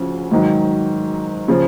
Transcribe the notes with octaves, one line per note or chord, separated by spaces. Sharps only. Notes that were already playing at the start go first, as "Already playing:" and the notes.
Already playing: D2 C#3 F3 C#4
G#2 D#3 F#3
C#3 F3